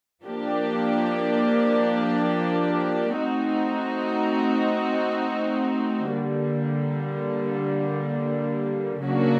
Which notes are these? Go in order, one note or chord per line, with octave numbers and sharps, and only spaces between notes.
F3 A#3 D4 G4
A3 C4 D#4 F#4
D3 G3 A#3
C#3 F#3 A#3 D4 F#4